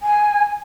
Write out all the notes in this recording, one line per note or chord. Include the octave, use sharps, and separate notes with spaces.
G#5